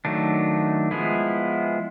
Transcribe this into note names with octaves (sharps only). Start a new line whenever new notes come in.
D#3 F#3 A3 D4
F3 G#3 B3 E4 G#4